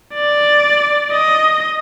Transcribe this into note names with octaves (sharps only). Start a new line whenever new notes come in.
D5
D#5